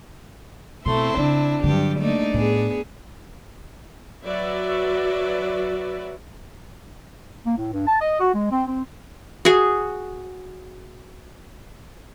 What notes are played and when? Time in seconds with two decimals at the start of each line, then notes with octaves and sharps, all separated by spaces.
0.86 B2 A3 C4 E4 C6
1.17 C#3 D4
1.64 G2 D3 F#3 G4
1.99 A3 A#3 D4 D#4 D5
2.34 A2 A3 B3 G#4
4.25 F#3 F#4 B4 D5 E5
7.46 A#3
7.58 A2
7.72 G2
7.87 A5
8.01 D#5
8.20 F#4
8.34 G#3
8.51 C4
8.67 C4
9.45 F#4 G#4